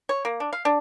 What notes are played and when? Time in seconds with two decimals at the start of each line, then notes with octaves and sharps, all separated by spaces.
0.09 C#5
0.25 A#3
0.40 D4
0.53 F5
0.65 D4